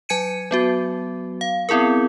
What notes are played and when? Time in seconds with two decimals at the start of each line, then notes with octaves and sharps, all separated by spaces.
0.09 F#3 G#5 G#6 C#7 D#7
0.51 F#3 B3 F#4
1.41 F5
1.69 B3 C4 E4 G#4 A#4